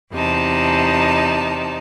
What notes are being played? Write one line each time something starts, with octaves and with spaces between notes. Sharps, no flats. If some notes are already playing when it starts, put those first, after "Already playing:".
E2 C3 D#4 A5